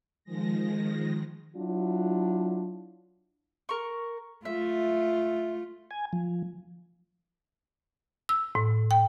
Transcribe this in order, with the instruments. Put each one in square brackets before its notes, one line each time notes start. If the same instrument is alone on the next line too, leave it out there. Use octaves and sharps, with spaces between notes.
[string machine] D#3 F3 G#3 A#6
[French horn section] F#3 D4 E4 F4
[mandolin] A#4 C#6
[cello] A3 F4 [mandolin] E5
[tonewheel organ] G#5
F3
[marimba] E6
A2
G5